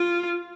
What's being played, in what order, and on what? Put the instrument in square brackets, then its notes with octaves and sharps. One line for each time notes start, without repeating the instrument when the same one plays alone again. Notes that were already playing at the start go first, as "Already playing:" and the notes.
Already playing: [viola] F4